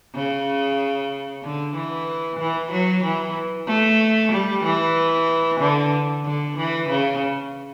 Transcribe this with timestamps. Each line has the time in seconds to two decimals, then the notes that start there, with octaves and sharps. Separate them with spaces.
0.14 C#3
1.43 D3
1.75 E3
2.39 E3
2.71 F#3
3.03 E3
3.67 A3
4.32 G3
4.64 E3
5.61 D3
6.25 D3
6.57 E3
6.89 C#3